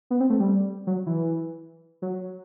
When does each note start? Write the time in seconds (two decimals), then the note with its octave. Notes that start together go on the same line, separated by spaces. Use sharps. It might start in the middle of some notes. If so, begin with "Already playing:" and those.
0.10 B3
0.20 C4
0.30 A3
0.40 G3
0.87 F#3
1.06 E3
2.02 F#3